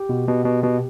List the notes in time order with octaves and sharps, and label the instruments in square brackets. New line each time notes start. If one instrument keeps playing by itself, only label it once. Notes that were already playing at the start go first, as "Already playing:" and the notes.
Already playing: [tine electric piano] G4
B2
B2
B2
B2